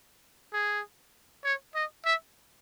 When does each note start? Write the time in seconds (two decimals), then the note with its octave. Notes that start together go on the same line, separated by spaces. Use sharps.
0.53 G#4
1.44 C#5
1.75 D#5
2.05 E5